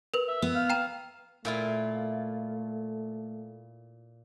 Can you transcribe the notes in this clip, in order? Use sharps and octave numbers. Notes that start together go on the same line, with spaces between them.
A#4 B4
E5
B3 E6
F5
G5 A#5 E7
A#2 A3 E4 F4